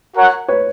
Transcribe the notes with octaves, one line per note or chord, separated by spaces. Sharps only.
F#4 A#4 C#5 F#5
B4 C#5